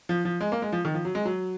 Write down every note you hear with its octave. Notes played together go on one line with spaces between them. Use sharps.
F3
F3
G#3
A#3
G#3
F3
D#3
F3
F#3
G#3
F#3